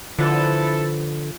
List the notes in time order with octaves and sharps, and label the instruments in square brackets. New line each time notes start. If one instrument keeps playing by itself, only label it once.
[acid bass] D3 [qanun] F3 B4 [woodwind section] E4 A4